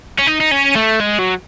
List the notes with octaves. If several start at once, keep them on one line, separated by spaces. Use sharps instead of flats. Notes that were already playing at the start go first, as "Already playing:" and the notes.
C#4
D#4
D#4
C#4
A3
G#3
F#3